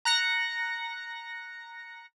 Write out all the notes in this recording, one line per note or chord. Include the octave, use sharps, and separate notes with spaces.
A#5 F#6 A#6 C#7